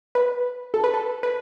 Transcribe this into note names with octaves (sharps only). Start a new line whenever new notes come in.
B4
A4
B4
A4
B4